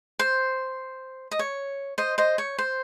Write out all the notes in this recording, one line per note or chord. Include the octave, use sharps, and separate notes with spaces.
C5
D#5
C#5
C5 D#5
C5 D#5
C#5
C5